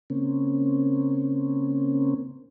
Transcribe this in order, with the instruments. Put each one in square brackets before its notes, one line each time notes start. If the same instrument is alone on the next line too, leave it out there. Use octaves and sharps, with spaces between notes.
[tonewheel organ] C#3 A#3 C4 C#4